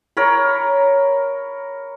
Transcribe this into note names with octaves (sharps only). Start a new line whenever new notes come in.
A#4 C#5 B5